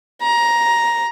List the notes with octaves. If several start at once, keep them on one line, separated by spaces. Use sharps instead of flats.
A#5